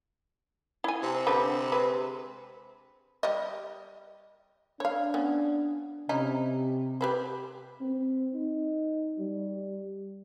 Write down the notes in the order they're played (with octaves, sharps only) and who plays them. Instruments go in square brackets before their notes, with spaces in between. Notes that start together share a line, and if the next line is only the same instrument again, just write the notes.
[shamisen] E4 G#5
[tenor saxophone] C3
[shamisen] D3 G4 B4
G#3 B4
G3 D#5
[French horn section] D4 [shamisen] C#5 F5
[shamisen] B3 C#4
[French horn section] C3 [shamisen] C#4 D#4 E4
[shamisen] G4 B4 C5
[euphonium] C4
D#4
G3